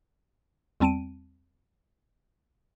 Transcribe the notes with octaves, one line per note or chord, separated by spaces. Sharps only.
E2 G3 C4 A5 D7 D#7